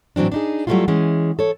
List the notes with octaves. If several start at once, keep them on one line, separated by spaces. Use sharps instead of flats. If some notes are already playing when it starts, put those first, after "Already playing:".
A2 E3 F#3 C4 D4
D4 D#4 G#4
F#3 G3 A3 B3 E4 F4
E3 G#3 C#4
A4 C#5